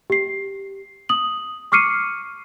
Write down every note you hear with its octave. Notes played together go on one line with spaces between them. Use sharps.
G4 C7
D#6 F#7
C#6 D6 F6 C7 C#7 D#7